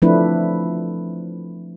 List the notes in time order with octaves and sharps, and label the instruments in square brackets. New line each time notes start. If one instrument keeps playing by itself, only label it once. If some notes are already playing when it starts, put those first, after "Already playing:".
[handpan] F3 A3 C4 D4 E4 B4